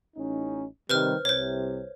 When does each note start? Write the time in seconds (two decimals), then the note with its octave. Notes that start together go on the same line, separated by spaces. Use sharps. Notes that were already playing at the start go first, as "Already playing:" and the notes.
0.16 A1 C#4 D#4
0.90 C3 D#3 G3 B4 C5 F6
1.25 C2 C3 C5 C#5